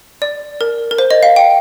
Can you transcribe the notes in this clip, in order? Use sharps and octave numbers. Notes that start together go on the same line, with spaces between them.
D5
A#4
A#4
C5
D#5
F5
G5